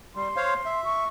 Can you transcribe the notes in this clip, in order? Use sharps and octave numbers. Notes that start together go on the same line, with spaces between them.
G3 C6
C5 C#5 F5
E5
C#6